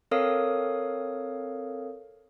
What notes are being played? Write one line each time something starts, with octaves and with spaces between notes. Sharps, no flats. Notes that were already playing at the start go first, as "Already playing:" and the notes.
C4 A4 A#4 C#5 F5 D#6